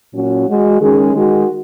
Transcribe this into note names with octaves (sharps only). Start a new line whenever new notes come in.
A#2 F#3 C#4 F#4
G#3 F#4
D#3 G#3 C#4 G#4
D#3 G#3 F#4